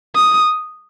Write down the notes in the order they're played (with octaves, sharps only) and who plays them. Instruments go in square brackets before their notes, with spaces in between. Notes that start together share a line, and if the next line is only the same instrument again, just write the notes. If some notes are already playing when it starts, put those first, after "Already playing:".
[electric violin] D#6